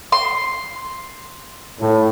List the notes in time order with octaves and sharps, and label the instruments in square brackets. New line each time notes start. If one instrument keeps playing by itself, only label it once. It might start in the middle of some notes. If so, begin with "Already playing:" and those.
[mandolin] C6
[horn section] A2